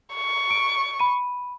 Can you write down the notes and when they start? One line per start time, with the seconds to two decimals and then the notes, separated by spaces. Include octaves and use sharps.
0.15 C#6
0.51 D7
1.00 B5 D#7